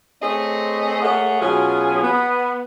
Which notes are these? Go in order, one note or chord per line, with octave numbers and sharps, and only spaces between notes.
A3 C4 G#4 C#5 D#5
A3 A#3 G#4 C#5 F#5
B2 F#3 C#4 F4 G#4
B3